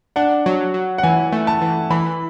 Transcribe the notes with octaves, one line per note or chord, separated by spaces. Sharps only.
D4 F#5
F#3
F#3
F#5
E3 G#5
A3
A5
E3
E3 B5